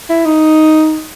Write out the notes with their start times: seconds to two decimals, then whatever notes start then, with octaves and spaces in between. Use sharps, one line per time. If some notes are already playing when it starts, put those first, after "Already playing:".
0.09 E4
0.26 D#4